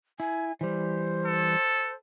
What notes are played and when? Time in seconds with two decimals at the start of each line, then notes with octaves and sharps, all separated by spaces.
0.20 E4 G#5
0.61 E3 G3 C5
1.26 A4